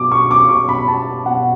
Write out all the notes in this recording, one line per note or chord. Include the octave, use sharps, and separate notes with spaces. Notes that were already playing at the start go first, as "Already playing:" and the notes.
Already playing: B2 D6
C#6
D6
B2 C#6
B5
A5
B2 F#5